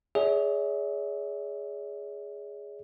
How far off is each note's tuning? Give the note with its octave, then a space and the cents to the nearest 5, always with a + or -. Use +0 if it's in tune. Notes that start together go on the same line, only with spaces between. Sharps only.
G#4 +0 C#5 +40 E5 -35